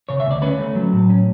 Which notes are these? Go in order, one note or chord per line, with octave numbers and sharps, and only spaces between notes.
C#3 C#5
E5
D2 D5
C#4 B4
A3
F#3
A2
C#4